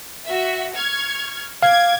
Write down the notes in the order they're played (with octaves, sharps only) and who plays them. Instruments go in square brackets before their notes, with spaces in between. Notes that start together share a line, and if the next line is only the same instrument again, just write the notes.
[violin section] F#4 E5
C#6 F6 G#6
[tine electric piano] F5 [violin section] D6 G#6